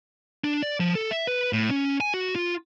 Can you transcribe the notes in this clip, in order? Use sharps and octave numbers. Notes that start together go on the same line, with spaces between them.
D4
D5
F3
A4
E5
B4
A2
C#4
G#5
F#4
F4